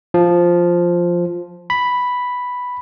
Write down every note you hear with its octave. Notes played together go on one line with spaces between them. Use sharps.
F3
B5